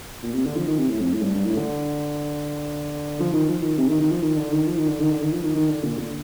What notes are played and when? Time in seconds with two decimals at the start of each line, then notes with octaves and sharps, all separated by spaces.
0.23 A#2
0.34 C3
0.46 D3
0.56 F3
0.67 D#3
0.79 C3
0.90 A2
1.01 F2
1.14 A2
1.23 G2
1.35 G2
1.46 A2
1.57 D3
3.20 F3
3.33 D#3
3.49 F3
3.63 D#3
3.78 C3
3.88 D#3
4.01 D#3
4.11 F3
4.22 D#3
4.37 D3
4.52 D#3
4.67 F3
4.78 D#3
4.88 D3
4.99 D#3
5.11 D3
5.21 D#3
5.33 F3
5.43 D#3
5.55 D#3
5.69 D3
5.84 A#2
5.99 D3